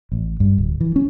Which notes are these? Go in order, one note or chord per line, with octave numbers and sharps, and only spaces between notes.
A1
G2
D1
E3
C#4